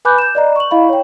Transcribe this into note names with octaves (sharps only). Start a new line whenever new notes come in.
B4 G#5 B5 D6 F#6 G6
G6 E7
D5 D#5 A#5
C#6 F#7
E4 D#5 F5 B5
C#5 G5